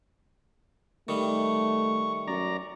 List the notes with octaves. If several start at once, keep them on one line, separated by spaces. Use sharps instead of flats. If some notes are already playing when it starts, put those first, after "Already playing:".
D#3 G3 A3 C#6
F#2 D5 A#5